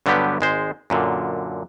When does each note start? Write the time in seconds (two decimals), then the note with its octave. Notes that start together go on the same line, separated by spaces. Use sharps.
0.06 G2 D3 F#3 G3 B3 G4
0.41 G#1 G#3 C5
0.90 F#2 A#2 D3